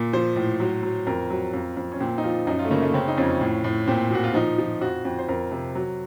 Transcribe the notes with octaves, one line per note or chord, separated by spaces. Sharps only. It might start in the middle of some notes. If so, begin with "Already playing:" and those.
Already playing: A#2
F3 C5
A2
F#3
F#3
F2 A#4
F#3
F2
F2
C#4
A#2 C4
D#4
F3 F4
F#2 D#4
F4
A3
C#3 A#3
A3
C#3 C4
D#4
F2 C#4
A2
A2
A#2 C4
A#2 F#4
F4
F3 D#4
F3
F2 F#4
F2
C5
F2 A#4
C3
F#3